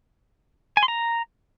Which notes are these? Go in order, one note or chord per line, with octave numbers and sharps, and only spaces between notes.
G#5
C6
A#5